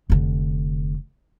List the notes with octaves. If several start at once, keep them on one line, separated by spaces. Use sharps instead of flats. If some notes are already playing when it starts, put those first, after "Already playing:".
F1 D3